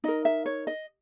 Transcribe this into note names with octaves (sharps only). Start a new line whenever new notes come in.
D#4 A#4 D#5
E5
C#5
D#5